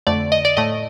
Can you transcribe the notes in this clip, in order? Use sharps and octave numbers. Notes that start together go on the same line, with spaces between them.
F2 D3 A3 D5
D#5
D5
A2 A3 D#5